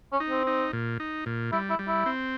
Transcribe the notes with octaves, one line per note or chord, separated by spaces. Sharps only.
C#4
D#4
C4
D#4
A#2
D#4
A#2
G3 E4
E4
G3
E4
C4